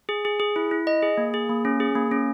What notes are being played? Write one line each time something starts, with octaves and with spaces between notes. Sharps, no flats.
G#4
G#4
G#4
E4
E4
D#5
G#4
A#3
G#4
A#3
C#4
G#4
A#3
C#4